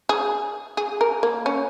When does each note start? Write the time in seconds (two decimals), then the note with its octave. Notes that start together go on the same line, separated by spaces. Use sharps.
0.09 G#4
0.77 G#4
1.01 A#4
1.23 A#3
1.46 C#4